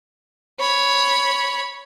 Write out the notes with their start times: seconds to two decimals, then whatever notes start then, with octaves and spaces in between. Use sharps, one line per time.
0.60 C#5 B5